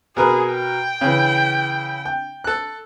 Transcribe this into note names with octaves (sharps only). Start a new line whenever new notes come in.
B2 G#4 A#4 B4
G5
C#3 E3
G5
A4 F#6